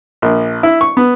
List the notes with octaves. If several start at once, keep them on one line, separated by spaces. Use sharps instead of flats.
A#1
E4
C#6
B3